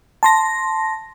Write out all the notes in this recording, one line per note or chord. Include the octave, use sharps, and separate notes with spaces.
A5 C6 A#6